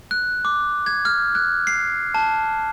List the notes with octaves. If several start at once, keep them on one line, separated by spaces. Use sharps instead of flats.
F#6
D6
G#6
F6
F#6
C7
A5